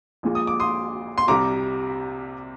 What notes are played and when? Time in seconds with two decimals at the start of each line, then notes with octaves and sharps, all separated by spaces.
0.23 A#1 A#2 G#3
0.35 D#6
0.47 D6
0.60 C6 D#6
1.18 C6
1.28 C2 C3 G3 A#5 D6